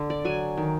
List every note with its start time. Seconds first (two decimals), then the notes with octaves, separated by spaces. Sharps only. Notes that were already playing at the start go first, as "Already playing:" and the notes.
Already playing: D3
0.10 D5
0.25 F#3 G#5
0.57 D#3